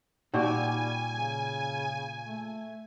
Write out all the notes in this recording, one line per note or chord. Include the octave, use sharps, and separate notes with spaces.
A#2 G3 D#4 F#4 G4 D5 G#5 C#6
C#3
A3